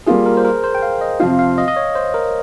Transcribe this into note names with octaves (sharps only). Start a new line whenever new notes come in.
G3 A#3 F4 G#4
A#4
C5
A#4
C5
G5
F5
D#5
F2 C3 F3 C4 F4 F5
F5
D#5
D#5
C#5
C5
A#4